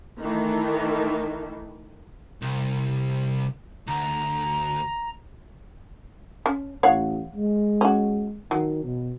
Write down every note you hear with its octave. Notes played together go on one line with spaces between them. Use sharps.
D#3 E3 A3
C2
D2 A#5
C#4
A1 C#5 F5 F#5
G#3
C#4 F#4
D#3 F#3
B2